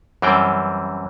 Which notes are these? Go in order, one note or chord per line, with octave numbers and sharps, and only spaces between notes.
F#2 E3 G3 C4 G5